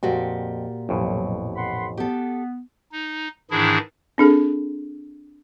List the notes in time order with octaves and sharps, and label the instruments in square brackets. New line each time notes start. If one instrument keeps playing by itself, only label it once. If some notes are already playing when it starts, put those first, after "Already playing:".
[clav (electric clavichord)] F2 [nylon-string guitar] A#2 F#4 G4
[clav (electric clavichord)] A1 F2 B2 [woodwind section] F#3
[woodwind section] F#5 B5 C6
[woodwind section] B3 [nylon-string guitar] G4 A4
[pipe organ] D#4
G#2 D#3 E3 D4 E4 G#4
[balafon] C4 D4 G#4 A4